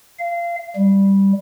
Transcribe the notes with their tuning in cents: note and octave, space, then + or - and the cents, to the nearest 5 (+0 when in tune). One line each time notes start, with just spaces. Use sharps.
F5 -25
G3 +0